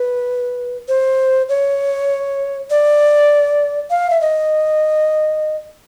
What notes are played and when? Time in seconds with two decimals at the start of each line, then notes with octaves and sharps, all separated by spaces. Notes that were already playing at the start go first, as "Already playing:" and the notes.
Already playing: B4
0.88 C5
1.49 C#5
2.71 D5
3.90 F5
4.10 E5
4.21 D#5